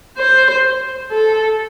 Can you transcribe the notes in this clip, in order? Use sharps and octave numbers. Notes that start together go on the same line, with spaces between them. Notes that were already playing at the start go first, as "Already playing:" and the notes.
C5
A4